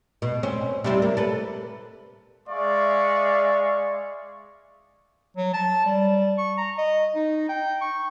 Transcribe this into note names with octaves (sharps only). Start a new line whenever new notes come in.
B2
C4 C#4
C3 G3 E4
A#3
A4 B4
G#3 D5 E5 F5 C#6
F#3
A5
G3
C#6
A#5
D#5
D#4
G5
C#6